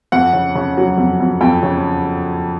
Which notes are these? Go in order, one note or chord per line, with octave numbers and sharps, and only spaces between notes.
F2 F#5
C#3
C#3
F#3
F2
F2
F2 G5
C#3